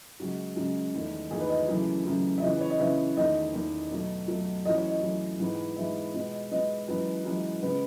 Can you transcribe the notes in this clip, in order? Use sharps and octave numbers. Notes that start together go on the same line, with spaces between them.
F#2 C#3 G#3 F#4
F#2 C#3 G#3
E2 D#3 A3
E2 D#3 A3 G#4
B4
D#5
B4
F#2 C#3 E3 A3
F#2 C#3 E3 A3
E5
C#3 E3 B3 D#5
B4
C#5
D#5
C#3 E3 B3 E5
E2 D#3 A3 D#5
E2 D#3 A3
B2 F#3 A3
B2 F#3 A3
F#2 E3 A3 D#5
C#5
D#5
F#2 E3 A3
G#2 E3 G#3 B3
G#2 E3 G#3 B3 E5
B2 G#3 B3
B2 G#3 B3 D#5
F#2 E3 G#3 B4
F#2 E3 G#3
C#3 G#3 B3 B4